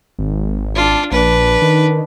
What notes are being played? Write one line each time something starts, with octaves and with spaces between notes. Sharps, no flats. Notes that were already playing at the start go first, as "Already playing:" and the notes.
G#1
D4 F4
A#1 D4 B4
D#3